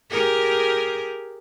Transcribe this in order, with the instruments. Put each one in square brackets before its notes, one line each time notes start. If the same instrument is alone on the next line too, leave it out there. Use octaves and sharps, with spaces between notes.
[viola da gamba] G4 G#4 A#4